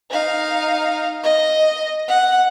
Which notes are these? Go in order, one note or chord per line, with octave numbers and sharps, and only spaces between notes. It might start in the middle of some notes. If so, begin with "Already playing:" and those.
D#4 F5
D#5
F#5